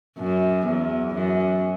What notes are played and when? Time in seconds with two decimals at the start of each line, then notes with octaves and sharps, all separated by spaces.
0.18 F#2
0.67 E2
1.14 F#2